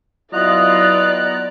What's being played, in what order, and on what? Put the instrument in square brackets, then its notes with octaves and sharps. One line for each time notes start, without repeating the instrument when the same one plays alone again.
[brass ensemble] F#3 E4 F4 [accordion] B3 A#5 F#6 [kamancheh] D5 [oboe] D#5